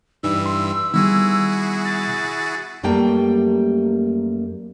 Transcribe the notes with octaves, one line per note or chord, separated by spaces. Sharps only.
G2 E3 G3 D#4 E6
C6
D#3 G3 B3 E4 F#4 G#4
A6
F#2 G3 A3 A#3 G5